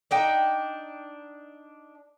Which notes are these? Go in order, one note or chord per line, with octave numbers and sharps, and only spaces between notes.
D4 D#4 G5